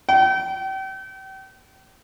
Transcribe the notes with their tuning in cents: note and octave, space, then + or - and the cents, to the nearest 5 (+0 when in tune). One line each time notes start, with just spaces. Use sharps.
G5 -35